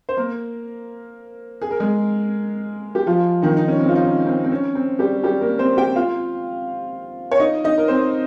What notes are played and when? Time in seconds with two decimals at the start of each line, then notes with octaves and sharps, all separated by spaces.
0.09 C5
0.17 A#3 A#4
1.62 G#4
1.71 A#4
1.80 G#3 G#4
2.95 G4
3.06 F3 F4
3.42 D#3 D#4
3.57 D#4
3.68 C#4
3.79 C4
3.89 F4
3.95 D#4
4.02 C#4
4.27 C4
4.44 C4
4.52 C#4
4.75 C4
4.99 G3 G4
5.24 G3 G4
5.41 A#3 A#4
5.59 C4 C5
5.77 G4 G5
5.96 F4 F5
7.31 C#5
7.40 D#4 D#5
7.64 D#4 D#5
7.78 A#4
7.88 C4 C5